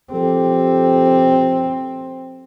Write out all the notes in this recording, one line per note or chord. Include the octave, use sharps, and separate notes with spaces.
F3 C4 G4 A4